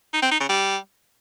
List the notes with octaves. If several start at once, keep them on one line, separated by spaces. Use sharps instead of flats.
D#4
C4
D#4
C#3
G3